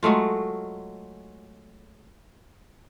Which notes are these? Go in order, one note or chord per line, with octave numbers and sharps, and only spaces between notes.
F#3 G#3 A3 F4